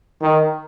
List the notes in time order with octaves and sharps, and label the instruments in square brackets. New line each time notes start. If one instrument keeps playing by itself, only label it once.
[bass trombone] D#3